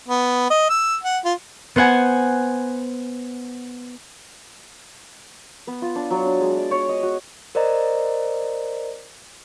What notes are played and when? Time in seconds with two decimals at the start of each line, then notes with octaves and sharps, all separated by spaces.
0.08 B3
0.50 D#5
0.70 E6
1.04 F#5
1.25 F4
1.76 B3 C5 F#5 G#5
5.67 B3
5.82 F4
5.96 D4
6.10 F#3
6.26 D4
6.41 G#3
6.57 D5
6.71 C#5
6.89 D#5
7.03 F#4
7.55 A#4 C5 D5 D#5 A#5